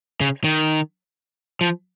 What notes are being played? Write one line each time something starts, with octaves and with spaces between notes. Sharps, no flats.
C#3
D#3
F3